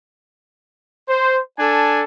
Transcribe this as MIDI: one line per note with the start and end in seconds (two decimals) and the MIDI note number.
1.08 1.40 72
1.59 2.03 62
1.59 2.03 69
1.59 2.03 80